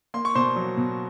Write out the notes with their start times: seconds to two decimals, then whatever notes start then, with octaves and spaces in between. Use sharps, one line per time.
0.14 A#3 C6
0.25 C#6
0.35 B2 C5 C6
0.56 F#3
0.77 B2